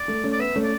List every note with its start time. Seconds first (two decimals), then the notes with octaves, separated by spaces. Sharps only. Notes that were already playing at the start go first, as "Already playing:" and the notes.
Already playing: D5
0.08 A3
0.24 A3 C#4
0.32 D5
0.39 B3 E5
0.56 A3 C#4
0.63 D5